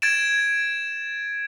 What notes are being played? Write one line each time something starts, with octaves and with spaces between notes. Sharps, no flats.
G#6 A6 D7 E7